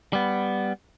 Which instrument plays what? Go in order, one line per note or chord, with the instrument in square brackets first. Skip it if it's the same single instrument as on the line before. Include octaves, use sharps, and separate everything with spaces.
[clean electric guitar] G3 B3